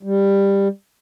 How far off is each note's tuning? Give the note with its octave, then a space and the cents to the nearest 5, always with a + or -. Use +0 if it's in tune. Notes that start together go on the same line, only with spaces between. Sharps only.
G3 +10